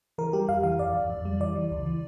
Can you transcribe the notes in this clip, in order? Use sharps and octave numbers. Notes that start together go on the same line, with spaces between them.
E3 A#4
G3 G4
F2 F5
E3 F5
F2 D5
F2
F2
G3
E3 D5
E3
C#2
E3